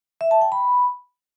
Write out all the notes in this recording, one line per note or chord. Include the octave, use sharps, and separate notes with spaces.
E5
A5
G5
B5